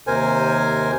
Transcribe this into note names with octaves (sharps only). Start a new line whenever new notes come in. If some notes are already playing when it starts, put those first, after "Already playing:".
D#2 C3 A#4 C5 G#5